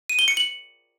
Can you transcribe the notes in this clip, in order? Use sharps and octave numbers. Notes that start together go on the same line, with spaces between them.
D#7
G7
C#7
F#7